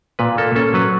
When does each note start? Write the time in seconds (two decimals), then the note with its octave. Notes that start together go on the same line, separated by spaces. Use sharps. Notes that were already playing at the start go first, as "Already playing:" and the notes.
0.19 A#2 B4
0.38 A#3 A4
0.55 C#4 A4
0.74 F#3 B4